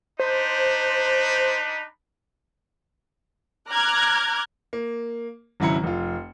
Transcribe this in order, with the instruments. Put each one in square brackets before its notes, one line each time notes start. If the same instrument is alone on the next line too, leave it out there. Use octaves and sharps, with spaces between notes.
[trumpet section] D4 D#4 B5 [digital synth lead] C5
[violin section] A#5 D6 F6 F#6 G#6
[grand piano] A#3
G#1 C#3 F#3 E4 A#5 C#7
F1 F4